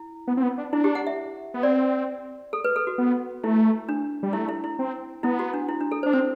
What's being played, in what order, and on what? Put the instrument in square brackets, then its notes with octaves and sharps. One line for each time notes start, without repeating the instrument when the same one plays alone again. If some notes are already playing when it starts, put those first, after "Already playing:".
Already playing: [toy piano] E4
[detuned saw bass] B3
C4
B3
D4
[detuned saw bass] D4 [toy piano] E4
[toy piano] G4
F#5
E5
[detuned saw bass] B3
[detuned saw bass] C4 [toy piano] D5
[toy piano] A4
B4
A4
F#4
[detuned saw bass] B3
[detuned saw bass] A3 [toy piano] E4
[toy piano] D4
[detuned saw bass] G3
[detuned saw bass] A3 [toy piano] E4
[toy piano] E4
E4
[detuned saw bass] C4
[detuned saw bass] B3 [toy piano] E4
[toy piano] F#4
D4
E4
D4
A4
C5
[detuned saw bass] D4
[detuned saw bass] C4 [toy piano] C5